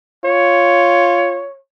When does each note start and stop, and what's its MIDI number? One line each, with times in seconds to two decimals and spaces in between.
0.25 1.46 65
0.25 1.58 73